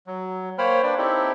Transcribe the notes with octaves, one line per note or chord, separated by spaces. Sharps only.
F#3
A#3 C5 C#5 G5 B5 F6
D4 B4 D5 G5
C4 D#4 E4 G4 A4